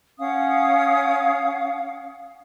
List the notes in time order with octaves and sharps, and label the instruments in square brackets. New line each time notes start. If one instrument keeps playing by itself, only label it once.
[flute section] C#4 F5 F#5 D#6